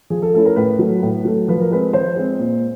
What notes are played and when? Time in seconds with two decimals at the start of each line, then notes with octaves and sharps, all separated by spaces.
0.10 F3 G#4
0.22 A4
0.34 A3 C#4 E4 A4
0.45 A#4
0.56 A2 B4
0.79 F#3 A3
1.03 A2
1.25 F#3 A3
1.48 F3 B4
1.61 A#4
1.71 G#3 C4 B4
1.93 F3 C5
2.16 G#3 C4
2.39 A#2